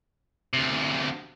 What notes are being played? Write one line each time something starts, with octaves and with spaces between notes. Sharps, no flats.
D2 C3